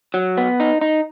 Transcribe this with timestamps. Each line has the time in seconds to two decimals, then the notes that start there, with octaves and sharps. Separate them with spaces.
0.14 F#3
0.37 B3
0.60 D#4
0.81 D#4